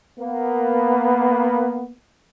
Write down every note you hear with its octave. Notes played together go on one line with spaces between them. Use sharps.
A#3 B3